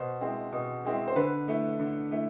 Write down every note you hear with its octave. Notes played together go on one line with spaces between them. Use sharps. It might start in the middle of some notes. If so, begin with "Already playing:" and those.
Already playing: B2 C5
G#3 C4 E4
B2
G#3 C4 E4
C5
D3 B4
A3 E4
D3
A3 E4